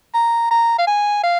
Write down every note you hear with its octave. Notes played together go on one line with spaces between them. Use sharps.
A#5
A#5
F5
G#5
F5